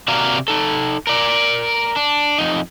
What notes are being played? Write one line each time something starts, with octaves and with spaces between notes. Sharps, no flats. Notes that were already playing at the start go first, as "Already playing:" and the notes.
C3 A#3 F#4 D5 F5 A#5
D#4 A4
A#4 D5
D4
F2 D#4